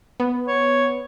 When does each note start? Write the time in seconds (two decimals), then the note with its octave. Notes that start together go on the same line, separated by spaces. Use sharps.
0.20 B3
0.48 C#5